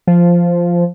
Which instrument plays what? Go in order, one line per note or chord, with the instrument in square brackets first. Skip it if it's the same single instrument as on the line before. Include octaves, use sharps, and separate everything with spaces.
[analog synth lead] F3